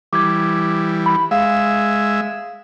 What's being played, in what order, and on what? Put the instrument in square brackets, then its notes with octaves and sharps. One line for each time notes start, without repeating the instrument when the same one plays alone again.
[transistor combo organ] E3 G3 [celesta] D6 G#6
[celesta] B5
[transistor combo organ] G#3 E5 [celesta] F5